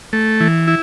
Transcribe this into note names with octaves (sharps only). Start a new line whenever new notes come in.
A3
E3
E4